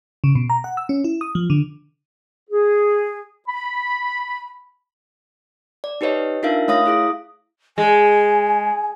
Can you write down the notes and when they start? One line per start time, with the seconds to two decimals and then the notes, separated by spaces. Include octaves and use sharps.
0.24 C#3
0.35 B2
0.50 A#5
0.64 F#5
0.77 E6
0.89 C#4
1.04 E4
1.21 D#6
1.35 F3
1.50 D3
2.50 G#4
3.48 B5
5.84 D5
6.01 D#4 G4 B4 C#5 D#5
6.43 D4 D#4 F4 A#4 E5 F5
6.68 A3 C#5 F5 D#6 A#6
6.86 E4 G#4 D#6 A#6
7.78 G#3 G#5